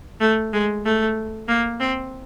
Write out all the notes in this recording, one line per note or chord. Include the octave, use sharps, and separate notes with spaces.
A3
G#3
A3
A#3
C4